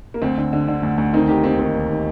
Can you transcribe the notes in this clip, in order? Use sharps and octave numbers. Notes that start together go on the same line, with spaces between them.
A#3
D2 C4
D3
D3
D3
D2
D2
D#3 C4 D#4
D#3 D#4 G4
D#2 C4 D#4
D#3 C4
D#2
D#3